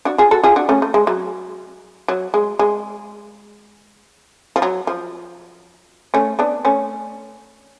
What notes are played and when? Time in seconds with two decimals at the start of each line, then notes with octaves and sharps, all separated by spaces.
0.05 D4 F#4
0.18 F4 G#4
0.31 F#4 A4
0.44 F4 G#4
0.56 D4 F#4
0.69 A3 C#4
0.82 A3
0.94 G#3
1.07 F#3
2.08 F#3
2.34 G#3
2.59 G#3
4.56 F3
4.62 F#3
4.87 F3
6.14 A3 C#4
6.39 B3 D4
6.65 A3 C#4